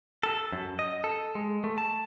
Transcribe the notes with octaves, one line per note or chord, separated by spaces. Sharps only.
A4
F#2
D#5
A4
G#3
A3
A5